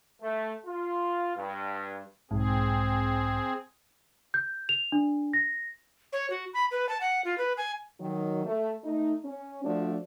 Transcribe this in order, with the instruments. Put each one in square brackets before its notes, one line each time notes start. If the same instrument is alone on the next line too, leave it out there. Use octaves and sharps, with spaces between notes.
[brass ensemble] A3
F4
G2
[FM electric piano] B1 G#2 [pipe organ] C4 G#4
[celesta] G6
F7
D4
A#6
[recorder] C#5
F#4
B5
B4
A5
F#5
F4
B4
G#5
[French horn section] D#3 F#3
A3
A3 D#4
C#4
F3 A3 D4 F#4 D5